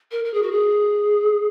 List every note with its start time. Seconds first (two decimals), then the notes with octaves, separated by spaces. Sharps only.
0.11 A#4
0.25 A#4
0.34 G#4
0.43 F#4
0.52 G#4